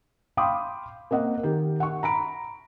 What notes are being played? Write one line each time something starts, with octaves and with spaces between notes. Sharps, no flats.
F5 G5 B5 C6 D6 D#6
A#3 C4 D#5 F#5
D#3 G4 A#4
F#5 C#6
A#5 B5 D7